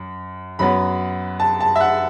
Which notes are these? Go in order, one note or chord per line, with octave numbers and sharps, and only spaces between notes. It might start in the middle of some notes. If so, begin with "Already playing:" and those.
Already playing: F#2
F#2 F#3 B3 B5
A5
A5
E5
F#5